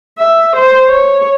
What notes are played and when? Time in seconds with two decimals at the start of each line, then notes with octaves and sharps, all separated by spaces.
0.18 E5
0.56 C5
0.88 C#5